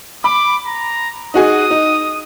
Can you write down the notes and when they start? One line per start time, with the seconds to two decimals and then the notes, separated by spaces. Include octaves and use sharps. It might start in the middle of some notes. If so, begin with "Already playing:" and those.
0.24 B5 D6
0.67 A#5
1.34 D#4 F#4 G#4 D#6
1.71 D#4